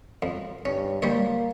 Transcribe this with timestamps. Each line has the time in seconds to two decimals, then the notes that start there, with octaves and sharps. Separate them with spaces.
0.22 F2
0.65 G2 C#4
1.02 G3 A#3 C5 C#5